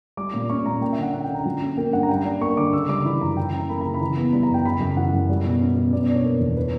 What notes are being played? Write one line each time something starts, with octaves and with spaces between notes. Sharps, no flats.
G3 D6
A#2
C#4 C#6
A#2 A#5
A#3 G5
E5
D3 F#5
C#4 F#5
G5
D3 A#5
F#3
C#4
A#3 G5
G2 F#5
A#5
G3 G5
D4
A#3 C#6
D3 D6
C#3 E6
G3 D6
E3 B5
F#2 A#5
E3 G5
C#4 A#5
A#3 B5
C#3 A#5
B5
E3
B3
G3 B5
A#5
F#2
G5
C#3 B5
F#2
E3 F#5
F#2
G3
B2
C#4
B2
B2 D5
D5
D4
C#5
A#3
E2
E3 B4